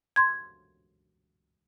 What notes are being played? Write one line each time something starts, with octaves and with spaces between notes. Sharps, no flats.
C6 G#6